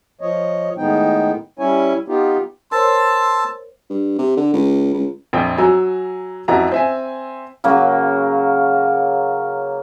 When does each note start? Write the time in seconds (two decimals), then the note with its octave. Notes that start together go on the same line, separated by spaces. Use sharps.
0.21 F3 C#5 D#5
0.78 A2 D#3 G#3 B3 D#4 G5
1.59 G3 C#4 E4 C#5 G#5
2.08 B3 D#4 F4 G4
2.72 A#4 C5 C#5 A5 C6 E6
3.90 G2
4.18 C3
4.37 D3
4.54 C#2
4.94 C#2
5.33 A#1 F2 G5
5.58 F#3 G#5 A#5 E6
6.48 A1 F2 E4 F#4 A#5
6.72 C4 E5 G#5
7.64 C#3 F#3 A#3